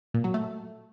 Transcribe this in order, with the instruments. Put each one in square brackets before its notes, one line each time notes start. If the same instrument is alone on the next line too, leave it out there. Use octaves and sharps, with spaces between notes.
[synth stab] A#2
F#3
A3